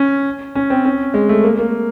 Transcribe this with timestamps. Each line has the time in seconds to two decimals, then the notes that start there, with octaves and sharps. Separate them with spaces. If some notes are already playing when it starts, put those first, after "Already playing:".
Already playing: C#4
0.55 C#4
0.70 C4
0.85 C#4
1.14 G#3
1.29 A3
1.44 A#3
1.59 A#3